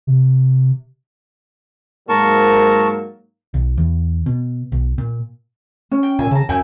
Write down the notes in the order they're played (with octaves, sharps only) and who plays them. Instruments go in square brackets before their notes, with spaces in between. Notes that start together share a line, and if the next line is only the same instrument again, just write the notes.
[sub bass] C3
[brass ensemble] G#2 F#3 A#3 [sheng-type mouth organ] A#4 A5 C#6
[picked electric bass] B1
E2
B2
B1
A#2
[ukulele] C#4
[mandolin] G5
[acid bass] A#2 [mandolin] G#5 E6
[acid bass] C#3 [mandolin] A5 A#5
[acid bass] F#2 [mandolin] E4 G#5 G6